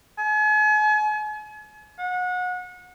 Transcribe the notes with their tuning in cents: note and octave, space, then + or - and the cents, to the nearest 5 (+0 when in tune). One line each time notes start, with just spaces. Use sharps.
G#5 +40
F#5 -30